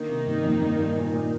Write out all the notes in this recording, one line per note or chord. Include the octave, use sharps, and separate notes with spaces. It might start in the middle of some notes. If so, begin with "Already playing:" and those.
Already playing: D3 D#3 A#3 D#4
C3
G2
F2
G2
G2
A#2
A#2